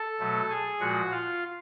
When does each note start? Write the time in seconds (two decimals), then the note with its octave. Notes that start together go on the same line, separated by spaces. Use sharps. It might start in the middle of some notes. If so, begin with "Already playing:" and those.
Already playing: A4 A5
0.19 B2 F#3 A3
0.50 G#4 G#5
0.80 A#2 F3 G#3 F#4 F#5
1.11 F4 F5